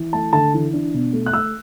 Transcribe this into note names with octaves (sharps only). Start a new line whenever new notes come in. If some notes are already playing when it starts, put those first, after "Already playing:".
Already playing: E3
A3 A5
D3 A5
E3
D4
B2
A3
F#6
A3 E6